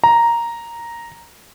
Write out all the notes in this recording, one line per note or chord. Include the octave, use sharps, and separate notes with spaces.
A#5